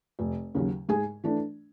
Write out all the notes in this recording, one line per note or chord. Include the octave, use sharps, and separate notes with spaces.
F1
D#2 C#3 F#3
G#2 G#4 G#5
E3 A3 D4